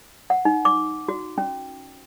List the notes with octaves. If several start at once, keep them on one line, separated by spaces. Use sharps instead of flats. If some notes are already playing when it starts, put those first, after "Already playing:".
F#5
D#4
D6
F#4
C#4